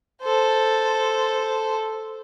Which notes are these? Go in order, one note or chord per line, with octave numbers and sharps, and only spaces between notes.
A4 C5